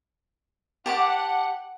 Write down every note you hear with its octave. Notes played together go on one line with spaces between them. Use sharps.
G4 F#5 A5 D6